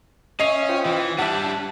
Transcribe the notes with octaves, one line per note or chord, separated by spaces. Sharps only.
C#4 D#5 E5 C7 F7
F4 C5 G5
E3
G3 D4 E5 F#5 A5